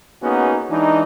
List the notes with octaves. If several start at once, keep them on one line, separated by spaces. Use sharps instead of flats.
A#3 B3 C#4 D#4 F#4 G#4
E3 G#3 D4 D#4